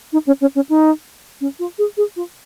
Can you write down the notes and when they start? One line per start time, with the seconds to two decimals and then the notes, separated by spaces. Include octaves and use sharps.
0.13 D#4
0.27 C#4
0.41 C#4
0.55 C#4
0.69 D#4
1.41 C#4
1.59 F4
1.78 G#4
1.97 G#4
2.16 F4